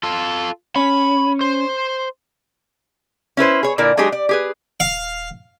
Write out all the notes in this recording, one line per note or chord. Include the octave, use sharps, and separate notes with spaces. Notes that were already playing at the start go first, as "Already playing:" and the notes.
F4 A4
C#4 B5
C5
C#4 E4 B4 C5
G#4 C#5
A#2 D3 E4 A#4 D5
F#3 G#3 D4 G4 G#4
D5
G4 G#4 B4
D#1 F5